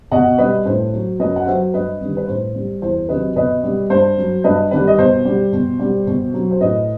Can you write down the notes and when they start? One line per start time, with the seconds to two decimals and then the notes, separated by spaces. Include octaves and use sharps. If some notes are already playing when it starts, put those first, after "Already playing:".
0.11 B2 D#5 F#5
0.38 G3 B4 D#5
0.66 A2 C5
0.93 F#3
1.20 F#2 B4 D#5
1.36 F#5
1.46 F#3 C5 E5
1.74 G2 B4 D#5
2.01 D#3 G3
2.17 B4
2.28 A2 C5
2.55 G3
2.82 E2 C5
3.09 C3 D#3 F#3 B4 D#5
3.36 B2 B4 D#5
3.63 G3
3.90 G2 C5
4.17 F#3
4.44 G2 B4 D#5
4.71 D#3 G3 B4
4.87 D#5
4.98 B2 C5
5.25 G3
5.53 B2
5.79 G3
6.07 B2
6.34 F#3
6.51 C5
6.61 A2 B4 D#5